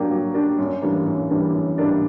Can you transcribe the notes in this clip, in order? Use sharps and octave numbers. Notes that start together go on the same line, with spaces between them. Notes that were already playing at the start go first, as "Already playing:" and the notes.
Already playing: F#3 A#3 D4 G4
F#3
A#3 D4 G4
F#2
E3 G3 A#3 D4
F#2
E3 G3 A#3 D4
F#2
E3 G3 A#3 D4